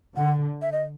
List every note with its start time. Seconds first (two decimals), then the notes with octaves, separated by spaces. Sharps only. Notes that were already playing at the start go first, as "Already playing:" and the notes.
0.16 D3 F#5
0.62 E5
0.72 D#5